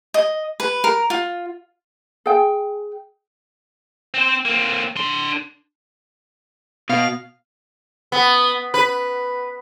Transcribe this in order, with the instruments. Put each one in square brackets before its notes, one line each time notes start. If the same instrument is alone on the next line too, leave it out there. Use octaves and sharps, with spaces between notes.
[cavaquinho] D#5
B4
A#4
F4
[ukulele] G#4 G5
[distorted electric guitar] C4 C5
A#3 C4
D4 C6
[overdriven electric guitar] B2 [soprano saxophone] F5
[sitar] B3
B4